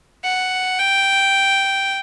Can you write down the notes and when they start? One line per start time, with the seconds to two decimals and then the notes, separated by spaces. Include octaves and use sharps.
0.24 F#5
0.79 G5